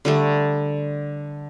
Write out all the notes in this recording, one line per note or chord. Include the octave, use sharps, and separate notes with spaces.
D3 G3 A3